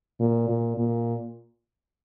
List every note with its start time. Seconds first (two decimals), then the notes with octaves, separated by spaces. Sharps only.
0.20 A#2
0.48 A#2
0.77 A#2